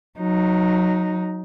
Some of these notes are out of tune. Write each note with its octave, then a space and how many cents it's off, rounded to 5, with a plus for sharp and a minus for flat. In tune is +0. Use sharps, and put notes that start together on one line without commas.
F#3 -15 D#4 +0